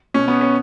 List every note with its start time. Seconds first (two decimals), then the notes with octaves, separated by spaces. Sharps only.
0.14 B2 C#4
0.28 B3
0.41 C#4